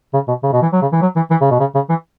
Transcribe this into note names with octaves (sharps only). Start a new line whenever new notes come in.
C#3
B2
C#3
B2
E3
F#3
C#3
E3
F#3
E3
E3
C#3
B2
C#3
C#3
E3